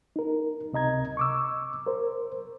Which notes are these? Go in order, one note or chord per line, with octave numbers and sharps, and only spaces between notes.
D#4 A#4
C#2 C3 D#5 A#5 G#6
C#6 D6 E6
A#4 C5